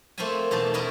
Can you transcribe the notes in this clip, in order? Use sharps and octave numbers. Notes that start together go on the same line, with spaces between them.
A3 A#3 C4 F4 E5 G#5
E2 B2 A3 D#4 A5
C#4 E4 A#4 D#5